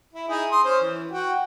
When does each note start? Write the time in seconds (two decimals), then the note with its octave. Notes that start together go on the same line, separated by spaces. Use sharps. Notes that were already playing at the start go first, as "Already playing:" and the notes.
0.14 E4
0.28 D#4 E4 G#4
0.51 C6 D#6
0.64 C#4 C5
0.81 E3
1.11 F#4 G5